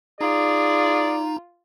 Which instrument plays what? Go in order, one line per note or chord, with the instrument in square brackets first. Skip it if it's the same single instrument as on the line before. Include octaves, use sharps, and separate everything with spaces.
[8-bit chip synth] D#4 A#5 [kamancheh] F4 [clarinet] G#4 [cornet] D5